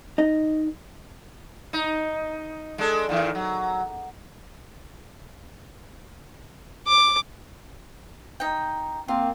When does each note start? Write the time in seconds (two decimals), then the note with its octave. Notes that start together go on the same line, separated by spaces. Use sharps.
0.18 D#4 D#5
1.73 D#4
2.78 G#3 D4 A4
3.09 A#2 D#3 E3
3.35 F#3
6.87 D6
8.40 D#4 G5
9.08 A#3 C4 F4